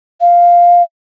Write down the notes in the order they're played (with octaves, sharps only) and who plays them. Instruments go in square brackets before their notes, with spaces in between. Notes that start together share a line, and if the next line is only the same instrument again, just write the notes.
[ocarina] F5